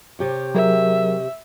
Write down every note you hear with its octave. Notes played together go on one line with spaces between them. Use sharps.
C3 G4 C#5
F#3 G#4 A#4 E5